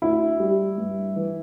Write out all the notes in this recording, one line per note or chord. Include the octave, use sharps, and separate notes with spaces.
D2 E4
G3
G2
E3